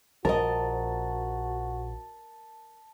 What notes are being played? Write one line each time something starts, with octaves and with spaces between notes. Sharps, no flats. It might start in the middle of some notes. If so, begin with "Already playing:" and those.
A#1 F3 F#4 A#4 D#5 A5